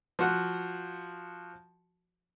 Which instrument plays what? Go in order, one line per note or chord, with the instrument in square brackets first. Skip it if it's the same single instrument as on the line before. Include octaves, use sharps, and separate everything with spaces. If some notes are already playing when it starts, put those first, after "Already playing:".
[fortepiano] F3 F#4 F#5